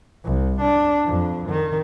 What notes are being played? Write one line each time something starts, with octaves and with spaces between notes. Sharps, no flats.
C2
D4
F2
D#3